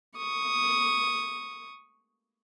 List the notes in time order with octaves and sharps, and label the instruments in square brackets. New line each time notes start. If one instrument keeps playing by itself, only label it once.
[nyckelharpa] C#6 D#6